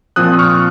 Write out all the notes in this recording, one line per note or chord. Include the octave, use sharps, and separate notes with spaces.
A#2 F3 C4 D#6 F#6
C#6 F6